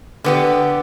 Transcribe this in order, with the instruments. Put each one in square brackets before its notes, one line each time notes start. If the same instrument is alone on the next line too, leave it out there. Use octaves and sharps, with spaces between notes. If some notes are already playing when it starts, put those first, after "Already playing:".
[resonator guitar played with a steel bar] D3 B3 G4